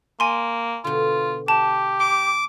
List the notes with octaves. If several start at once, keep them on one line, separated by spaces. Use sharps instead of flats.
A#3 G#5 C6
B2 D3 F4
G4 A5
C6 D6